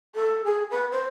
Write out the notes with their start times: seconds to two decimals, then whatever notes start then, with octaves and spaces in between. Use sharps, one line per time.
0.16 A4
0.45 G#4
0.71 B4
0.91 C5